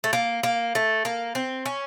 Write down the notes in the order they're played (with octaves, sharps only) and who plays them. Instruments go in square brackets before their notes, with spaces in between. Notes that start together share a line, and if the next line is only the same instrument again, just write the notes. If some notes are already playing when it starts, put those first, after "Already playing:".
[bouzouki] A3
A#3
A#3
A3
A#3
C4
C#4